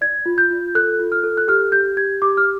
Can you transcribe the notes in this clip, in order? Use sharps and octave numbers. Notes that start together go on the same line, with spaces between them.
D5 G#6
F4
G6
F4
A4 F#6
F4
F6
A4
F#6
G4 F6
G4 G6
G4 G#6
G4 D6
F6